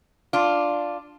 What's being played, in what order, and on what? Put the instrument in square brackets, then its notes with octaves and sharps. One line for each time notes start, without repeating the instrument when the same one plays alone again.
[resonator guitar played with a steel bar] D4 F4